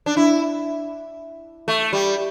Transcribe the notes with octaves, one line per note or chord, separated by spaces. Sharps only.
D4
E4
A3
G3